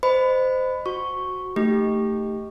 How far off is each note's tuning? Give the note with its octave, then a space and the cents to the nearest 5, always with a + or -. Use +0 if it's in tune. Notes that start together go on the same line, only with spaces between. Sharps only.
C5 -20 D#5 -25 B5 +20
F#4 +0 C#6 +0
A3 +15 D#4 +0 G4 +5